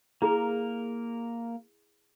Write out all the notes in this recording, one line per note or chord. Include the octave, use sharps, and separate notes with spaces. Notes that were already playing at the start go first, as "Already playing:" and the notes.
A#3 E4 G#4 A#4 A#5